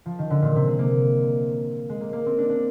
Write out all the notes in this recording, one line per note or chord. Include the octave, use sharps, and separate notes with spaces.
F3
D#3
D3
A#2
C3
G#3
A#3
G#3
A#3
A#3
C4
D4
D4